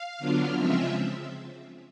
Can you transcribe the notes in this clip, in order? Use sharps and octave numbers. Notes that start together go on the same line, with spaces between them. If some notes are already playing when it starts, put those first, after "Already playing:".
Already playing: F5
D3 F#3 B3 D4 F4
C#3 F3 G#3 C4 F4 E5